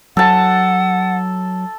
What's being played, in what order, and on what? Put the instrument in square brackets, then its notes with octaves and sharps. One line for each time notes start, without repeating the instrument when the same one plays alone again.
[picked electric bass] F#3 [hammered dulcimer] A4 A5 [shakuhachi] F#5